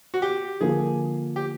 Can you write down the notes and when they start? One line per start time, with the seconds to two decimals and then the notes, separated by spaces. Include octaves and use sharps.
0.14 F#4
0.22 G4
0.61 D3 F3 A#3 G#4
1.36 G4